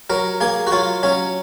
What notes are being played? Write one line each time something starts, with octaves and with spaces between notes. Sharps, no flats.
F#3 A#4
A#3 G#4
F#4
F#3 F4
F#3 C#4